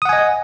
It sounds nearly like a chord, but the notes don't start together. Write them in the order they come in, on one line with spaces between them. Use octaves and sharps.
D#6 F#5 G#5 D#5